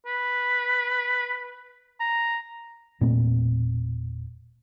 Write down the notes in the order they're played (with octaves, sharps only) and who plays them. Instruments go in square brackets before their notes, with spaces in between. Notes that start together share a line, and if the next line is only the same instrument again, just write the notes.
[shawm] B4
A#5
[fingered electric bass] E1 A#2 A3 C4